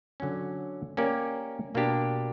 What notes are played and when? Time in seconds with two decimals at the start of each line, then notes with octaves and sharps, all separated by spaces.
0.20 D3 F#3 C#4
0.97 A#3 C#4 G4 A#4 D5
1.75 B2 A#3 D4 G4